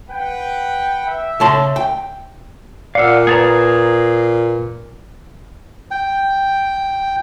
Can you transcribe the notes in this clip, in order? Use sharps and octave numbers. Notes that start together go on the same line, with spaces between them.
B4 F#5 G5
E5
C#3 A5 C6
G5
A#2 D5 F5 F#5 E6 F6
A#3 G#4 B4 A5 A#5
G5